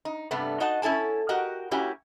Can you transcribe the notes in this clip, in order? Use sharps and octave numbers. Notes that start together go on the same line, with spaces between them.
D#4
G2 C3 G3 A3 B3
D#4 F#4 D#5 F#5 A5
C#4 E4 A4 G#5 A5
F#4 G4 A#4 D#5 F#5
A#3 C#4 E4 F#4 G4 G#5